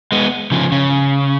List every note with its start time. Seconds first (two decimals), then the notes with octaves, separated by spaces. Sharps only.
0.12 G#3 B3
0.52 C#3 F3
0.72 C#3